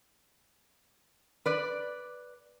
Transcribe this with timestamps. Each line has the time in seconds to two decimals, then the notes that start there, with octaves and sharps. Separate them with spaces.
1.46 B4 D5